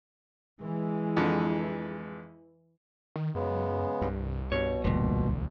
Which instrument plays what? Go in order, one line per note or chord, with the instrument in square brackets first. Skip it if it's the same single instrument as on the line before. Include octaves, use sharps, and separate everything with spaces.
[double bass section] E3 [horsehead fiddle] G#3
[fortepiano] F2 D3
[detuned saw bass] D#3
[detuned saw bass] F#2 [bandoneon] C#3 G#3 B3
[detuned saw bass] C2 [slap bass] G2
[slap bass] G2 [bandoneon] B2 [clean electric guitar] C#5
[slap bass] E1 D2 [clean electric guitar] G2 A#2